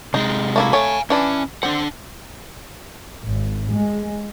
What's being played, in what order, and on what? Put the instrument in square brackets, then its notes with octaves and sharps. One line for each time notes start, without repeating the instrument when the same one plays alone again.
[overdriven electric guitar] C3 G#3 [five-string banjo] D#4
[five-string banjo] A3 A#3 E4
[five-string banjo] A3 C#5 [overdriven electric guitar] F5 G#5
[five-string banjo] E3 D4 E4 [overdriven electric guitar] C#4
[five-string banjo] C4 [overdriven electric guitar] D4 F#5
[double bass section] G#1
G#3